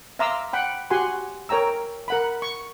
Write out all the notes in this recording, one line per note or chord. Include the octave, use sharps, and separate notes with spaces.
E5 F5 A#5 C6 D6 E6
F#5 G5 B5
F#4 G4 F#5 G#5 C6
A#4 C#5 G5 A#5 E6
A#4 F#5 B5
C#6